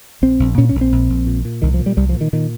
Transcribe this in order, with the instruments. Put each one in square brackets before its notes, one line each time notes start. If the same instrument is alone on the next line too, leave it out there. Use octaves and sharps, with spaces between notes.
[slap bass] A#1 C4
A#1
A#2 C#4
C#4
A#1
C4
A#1
A#1
A#2
A#2
C2 D#3
F3
A#2
G3
C2 G3
F3
A#2
D#3
A#2 D#3